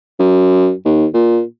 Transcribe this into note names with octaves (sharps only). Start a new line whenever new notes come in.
F#2
D#2
A#2